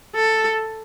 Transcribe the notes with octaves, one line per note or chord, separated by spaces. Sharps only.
A4